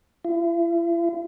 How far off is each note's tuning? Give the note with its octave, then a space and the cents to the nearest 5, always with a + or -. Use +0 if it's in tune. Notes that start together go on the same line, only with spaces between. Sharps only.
E4 +45